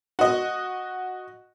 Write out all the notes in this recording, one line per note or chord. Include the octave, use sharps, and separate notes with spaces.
F#4 D#5